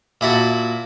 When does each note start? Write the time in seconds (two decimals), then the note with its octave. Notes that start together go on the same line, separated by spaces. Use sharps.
0.21 A#2 E4 F#4 A5